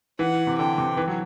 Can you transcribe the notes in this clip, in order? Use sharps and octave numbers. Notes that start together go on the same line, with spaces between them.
E3 F#5
C3
D3 G5
C3
E3
F#3